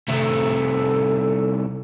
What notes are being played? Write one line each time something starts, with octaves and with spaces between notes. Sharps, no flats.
C2 A3 A4